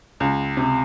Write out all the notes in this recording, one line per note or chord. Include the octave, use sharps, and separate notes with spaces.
C#2
C3